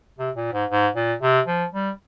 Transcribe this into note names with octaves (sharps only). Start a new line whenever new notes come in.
C3
A#2
G#2
G#2
A#2
C3
F3
G3